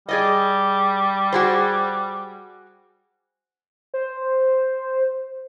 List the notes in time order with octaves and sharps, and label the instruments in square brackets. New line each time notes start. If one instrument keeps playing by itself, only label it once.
[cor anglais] G3 [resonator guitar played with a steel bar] G#4 D5 D#5
[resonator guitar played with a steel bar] F#4 G#4 C5
[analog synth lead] C5